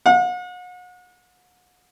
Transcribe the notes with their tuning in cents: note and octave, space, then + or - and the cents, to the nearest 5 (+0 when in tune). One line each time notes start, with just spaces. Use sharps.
F#5 -40